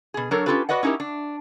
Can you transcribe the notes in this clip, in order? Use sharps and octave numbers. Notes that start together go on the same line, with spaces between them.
B2 G#4
F#3 D4 A4 A#4 C#5
C#4 D#4 F4 G4 A4 B4
F#4 B4 D5 D#5 F#5
C#4 D#4 E4 G4 A#4
D4